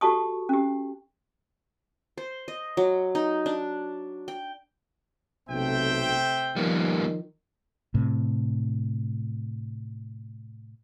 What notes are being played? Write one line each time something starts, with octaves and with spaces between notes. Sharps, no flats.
F#4 G4 A4 A5 C#6 D#6
C#4 G4
C5
D#5
F#3
D#4
D4
G5
B1 C3 A3 C5 E5 G5
D#3 F3 G3 A#3 B3
A2 C3